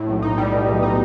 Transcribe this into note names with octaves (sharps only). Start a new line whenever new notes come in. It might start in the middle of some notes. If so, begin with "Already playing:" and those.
Already playing: A2
B1
D#4
G3
B2
B1
D#4